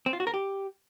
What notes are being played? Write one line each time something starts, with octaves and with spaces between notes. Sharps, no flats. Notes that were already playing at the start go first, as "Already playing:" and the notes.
C4
F4
F#4
A#4
G4